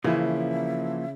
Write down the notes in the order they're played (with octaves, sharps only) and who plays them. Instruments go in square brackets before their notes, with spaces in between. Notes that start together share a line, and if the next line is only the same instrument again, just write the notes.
[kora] C#3 [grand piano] E3 E4 [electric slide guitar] F3 A#3 [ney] E5